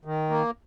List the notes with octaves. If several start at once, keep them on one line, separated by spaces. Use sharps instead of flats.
D#3
A#3